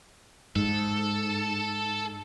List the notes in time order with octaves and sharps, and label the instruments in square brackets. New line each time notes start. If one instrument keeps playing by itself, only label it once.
[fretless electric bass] G#2 [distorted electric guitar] A4